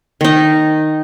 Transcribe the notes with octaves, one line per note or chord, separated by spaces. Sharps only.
D#3 D#4